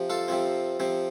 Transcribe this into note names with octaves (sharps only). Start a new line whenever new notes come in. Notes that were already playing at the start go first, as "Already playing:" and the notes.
Already playing: C3 F3
F4 A4
C3 F3 C4
C3 F3 C4